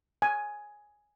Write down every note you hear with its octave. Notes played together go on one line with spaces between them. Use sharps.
G#5